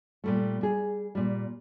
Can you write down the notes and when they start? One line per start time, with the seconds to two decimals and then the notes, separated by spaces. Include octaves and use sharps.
0.24 A#2 G3 A3
0.61 G3 G#4
1.15 A#2 G3